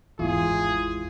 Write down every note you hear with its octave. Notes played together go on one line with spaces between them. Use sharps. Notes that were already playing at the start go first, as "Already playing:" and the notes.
G#1 E2 G#3 E4 F4 G#4